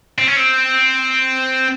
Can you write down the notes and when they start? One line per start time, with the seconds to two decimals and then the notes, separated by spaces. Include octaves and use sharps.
0.18 C4
0.27 C#4
0.36 C4